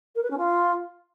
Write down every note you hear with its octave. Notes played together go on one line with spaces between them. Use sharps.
A#4
B4
C#4
F4